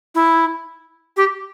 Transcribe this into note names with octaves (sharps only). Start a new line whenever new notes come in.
E4
G4